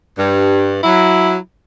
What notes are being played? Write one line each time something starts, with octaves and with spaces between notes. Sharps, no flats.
G2
F#3 E4